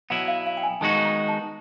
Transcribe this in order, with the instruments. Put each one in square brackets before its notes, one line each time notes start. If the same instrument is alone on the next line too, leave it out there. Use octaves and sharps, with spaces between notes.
[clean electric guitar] B2 F#3 B3 E4 [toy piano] F#5
[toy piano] F5
F5
G5
G#5
[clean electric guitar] D#3 G#3 B3 D#4 F#4 [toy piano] A5
[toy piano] A#5
A5